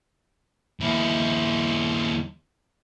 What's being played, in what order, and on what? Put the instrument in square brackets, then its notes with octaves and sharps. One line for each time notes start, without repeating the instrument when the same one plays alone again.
[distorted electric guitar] D#2 E4